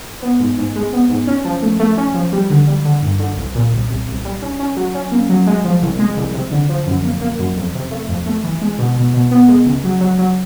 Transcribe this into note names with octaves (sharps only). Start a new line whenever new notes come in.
B3
G#2
G#2
G#3
B3
G#2
C#4
F3
A3
A3
C#4
F3
G3
D3
G3
D3
G2
D3
C2
A#2
C2
C2
C2
G3
C#4
C#4
F#3
C#4
A#3
F#3
G#3
F3
C2
G#3
C2
C3
D3
F3
F#2
A#3
A#3
F#2
F2
C3
A3
F2
A3
E3
G#3
B2
B2
B2
B3
G#3
C#2
F#3
F#3
F#3